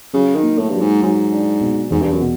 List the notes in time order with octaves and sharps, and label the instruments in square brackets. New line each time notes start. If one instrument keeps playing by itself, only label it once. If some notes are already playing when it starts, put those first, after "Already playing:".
[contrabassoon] C#3 [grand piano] F#3
[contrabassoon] D#3
[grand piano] A#3
[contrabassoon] A2
[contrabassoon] G2 [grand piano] F#3
[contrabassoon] G#2
[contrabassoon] G#2 [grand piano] F#3
[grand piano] D4
B2
[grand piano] E2 [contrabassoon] G#2
[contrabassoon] G2
F#2
[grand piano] B2